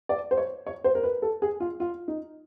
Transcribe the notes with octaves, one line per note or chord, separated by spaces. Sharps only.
D5
C5
C#5
C#5
C5
A#4
B4
A4
G#4
F4
F4
D#4